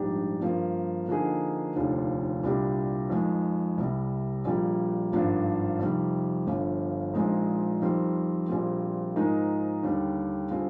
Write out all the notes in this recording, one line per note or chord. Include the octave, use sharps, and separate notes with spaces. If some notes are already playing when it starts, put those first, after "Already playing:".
Already playing: A#1 G#2 G3 D4 G4
G2 F3 A#3
D3 F3 A#3 D#4 G#4
F1 D#2 D3 F3
C2 A#2 G3 D4 G4
F2 D#3 G#3
C2 C3 G3
A#1 A#2 G3
G#1 G2 F3 A#3 D4
F2 C3 D#3 G3
G1 G2 F3
A#1 A#2 G#3 C4 D#4
F2 D#3 G3 C4
A#1 A#2 G3 C4
G#2 F3 G#3 D#4 A#4
D#2 D3 G3
D3 G3 C4 F4 G#4